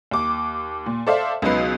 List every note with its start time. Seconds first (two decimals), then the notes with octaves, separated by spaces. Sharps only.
0.11 D#2 D6
0.86 A#2
1.07 A4 C5 D5 E5 F5
1.42 C#2 B2 F#3 D#4 B4 C7